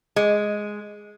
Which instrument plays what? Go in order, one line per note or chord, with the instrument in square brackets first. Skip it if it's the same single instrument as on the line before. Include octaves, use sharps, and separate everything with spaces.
[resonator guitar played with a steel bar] G#3